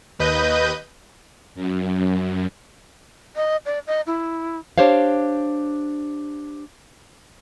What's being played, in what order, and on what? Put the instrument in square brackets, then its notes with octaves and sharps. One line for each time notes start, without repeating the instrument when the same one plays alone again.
[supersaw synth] D#2 B4 D#5 G6 D#7
[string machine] F#2
[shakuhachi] D#5
D5
D#5
E4
[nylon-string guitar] D4 G4 C5 C#5 F5